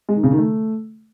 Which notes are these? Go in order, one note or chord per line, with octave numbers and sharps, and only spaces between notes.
G#3
D#3
C#3
D#3
A3